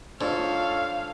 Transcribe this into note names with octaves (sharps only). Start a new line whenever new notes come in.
G#2 D4 F4 A4 C#5 F5